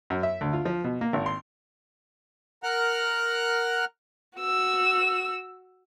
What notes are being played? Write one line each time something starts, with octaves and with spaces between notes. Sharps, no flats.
F#2
E5
D2
F4
F3
B2
A#3
G#1
C6
A#4 F#5 F6 F#6
F#4 E6